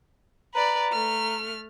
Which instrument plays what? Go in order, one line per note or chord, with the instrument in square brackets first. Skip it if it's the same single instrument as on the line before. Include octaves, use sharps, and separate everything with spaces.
[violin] B4 D5 [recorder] A#5
[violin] A3 F6